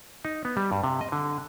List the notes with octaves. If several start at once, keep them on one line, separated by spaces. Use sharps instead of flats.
D#4
B3
G3
G2
C3
D#5
D3